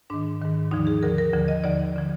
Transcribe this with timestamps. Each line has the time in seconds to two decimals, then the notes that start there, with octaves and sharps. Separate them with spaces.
0.10 G#2 D#3 D4
0.42 G#2 D#3
0.71 D#2 D3 F3 D#4
0.87 G#4
1.03 D#2 D3 F3 A#4
1.18 A#4
1.33 D#2 D3 F3
1.48 D#5
1.64 D#2 D3 F3 D5
1.96 D3 F3